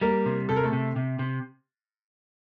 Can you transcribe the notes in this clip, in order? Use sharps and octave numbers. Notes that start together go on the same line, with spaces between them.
G3 A#3 A#4
C3
C3 A4
A#4
A3 A4
C3
C3
C3